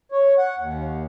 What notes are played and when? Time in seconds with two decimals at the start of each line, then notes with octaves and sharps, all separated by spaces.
0.12 C#5
0.38 F#5
0.59 D#2